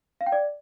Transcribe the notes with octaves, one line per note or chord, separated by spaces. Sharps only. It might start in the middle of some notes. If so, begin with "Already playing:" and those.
F5
G5
D5